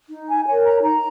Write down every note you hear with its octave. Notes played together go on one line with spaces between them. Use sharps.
D#4
G#5
A#4 C#5 G#5
A#5
D#4 A#5